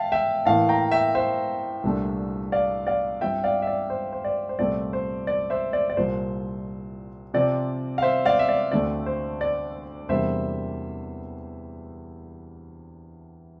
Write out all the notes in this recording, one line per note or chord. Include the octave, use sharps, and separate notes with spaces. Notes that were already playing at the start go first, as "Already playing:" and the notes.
Already playing: E5 F5 G5 A5
E5 G5
A2 E3 A#3 F5 A5
G5 A#5
E5 G5
C5 E5
C2 A#2 A3 D4
D5 F5
D5 F5
G2 F3 C4 E5 G5
D5 F5
E5
D5
C5
C5
D5
C5
C2 A#2 A3 C4 D5
C5
D5
C5 E5
D5
D5
C2 A#2 F3 C5
C3 F3 C4 D5
F5
C5 E5
D5 F5
E5
D5
D2 D3 A3 C4 D5
C5
D5
E2 C3 G3 A#3 D4 C5 E5